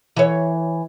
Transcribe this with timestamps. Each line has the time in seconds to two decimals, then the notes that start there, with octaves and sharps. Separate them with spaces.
0.16 E3 C#5